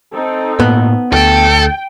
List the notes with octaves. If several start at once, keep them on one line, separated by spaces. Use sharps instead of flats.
C4 D#4 A4
A2 A#3 B3
D2 A4 G5